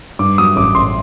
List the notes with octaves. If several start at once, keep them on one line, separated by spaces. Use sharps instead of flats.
G2 D6
F#3 D#6
A1 D6
A1 C6